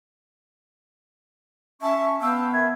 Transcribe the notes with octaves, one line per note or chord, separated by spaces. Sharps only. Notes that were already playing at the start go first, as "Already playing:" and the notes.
C#4 E5 A5 C#6
B3 F5 G5 A5 E6
D#3 E5 G#6